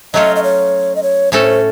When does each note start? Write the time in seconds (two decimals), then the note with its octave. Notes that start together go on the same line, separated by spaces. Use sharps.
0.14 F#3 A3 C#4 F4 D#5
0.36 D#5
0.43 C#5
0.96 D#5
1.03 C#5
1.32 A2 A3 C#4 A4 C5